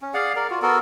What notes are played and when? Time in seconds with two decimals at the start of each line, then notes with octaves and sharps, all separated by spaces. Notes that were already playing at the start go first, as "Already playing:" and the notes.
0.02 C#4
0.14 G#4 D5 F5 F#5
0.36 A#4 D5
0.50 F4 F#4
0.62 B3 F#4 A4 A#4